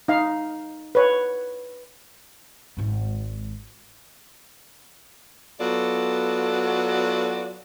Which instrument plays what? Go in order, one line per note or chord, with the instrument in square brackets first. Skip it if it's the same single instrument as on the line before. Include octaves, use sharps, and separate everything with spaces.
[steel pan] D#4 F5
B4 C#5
[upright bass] G#1 G#2
[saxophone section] F#3 B3 F4 F#4 A4 D5